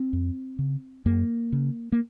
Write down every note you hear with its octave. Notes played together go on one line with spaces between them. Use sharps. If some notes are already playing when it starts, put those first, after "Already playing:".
Already playing: C4
F2
C#3
F#2 A#3
C#3
A#3